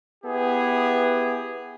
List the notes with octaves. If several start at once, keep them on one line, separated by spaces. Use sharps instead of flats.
B3 E4 G4 G#4